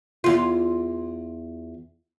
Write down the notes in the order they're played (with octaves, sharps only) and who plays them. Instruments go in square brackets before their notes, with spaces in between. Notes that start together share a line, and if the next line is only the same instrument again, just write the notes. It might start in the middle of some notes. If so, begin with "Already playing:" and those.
[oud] E2 F4